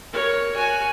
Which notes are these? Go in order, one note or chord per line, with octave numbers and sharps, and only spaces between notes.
A#4 C#5
F#4 G#5